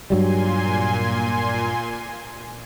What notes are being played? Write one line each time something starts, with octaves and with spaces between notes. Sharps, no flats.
G2 A#2 F#3 G3 G#5 C6